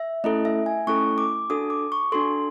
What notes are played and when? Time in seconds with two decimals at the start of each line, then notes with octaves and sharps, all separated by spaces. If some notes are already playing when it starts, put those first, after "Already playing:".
Already playing: E5
0.24 A3 C#4 E4 A4 D#5
0.45 E5
0.66 G#5
0.87 A3 C#4 E4 A4 C#6
1.18 D6
1.50 D4 F#4 A4 D#6
1.70 D6
1.92 C#6
2.12 D4 F#4 A4 C6